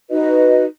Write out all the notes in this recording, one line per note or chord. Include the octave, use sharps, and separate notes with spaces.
D#4 F#4 B4 D#5